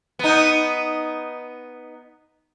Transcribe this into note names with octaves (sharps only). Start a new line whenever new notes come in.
B3 D#4